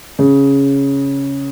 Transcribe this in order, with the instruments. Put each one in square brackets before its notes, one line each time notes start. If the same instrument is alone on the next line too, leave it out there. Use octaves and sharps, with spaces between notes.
[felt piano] C#3